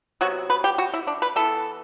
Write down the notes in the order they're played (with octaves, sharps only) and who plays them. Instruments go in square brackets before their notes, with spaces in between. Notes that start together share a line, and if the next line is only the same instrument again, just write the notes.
[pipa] C3 F#3 B3 F#4
B4
G4
F#4
E4
D4
B4
E3 B3 A4